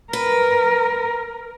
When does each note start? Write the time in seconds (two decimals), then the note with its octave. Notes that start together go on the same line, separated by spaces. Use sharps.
0.13 A#4 B4